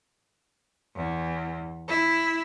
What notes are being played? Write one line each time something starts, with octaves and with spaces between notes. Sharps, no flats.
E2
E4